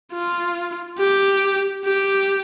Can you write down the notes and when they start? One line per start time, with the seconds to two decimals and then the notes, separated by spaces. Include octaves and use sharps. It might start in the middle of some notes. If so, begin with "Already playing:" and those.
0.13 F4
0.99 G4
1.85 G4